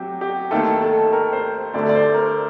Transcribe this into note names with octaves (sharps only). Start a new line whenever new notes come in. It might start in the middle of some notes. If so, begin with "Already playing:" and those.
Already playing: C3 F#3 F#4 G4
G4
D#2 D#3 A3 A4
A4
A#4
C5
D2 D3 A3 D5
D5
C5
A#4